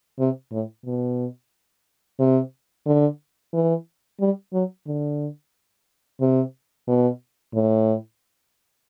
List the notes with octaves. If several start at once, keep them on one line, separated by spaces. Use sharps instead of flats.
C3
A2
B2
C3
D3
E3
G3
F#3
D3
C3
B2
A2